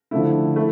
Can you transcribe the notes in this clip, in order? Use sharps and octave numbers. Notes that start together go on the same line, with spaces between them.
D3 F3 A3 E4
A3 E4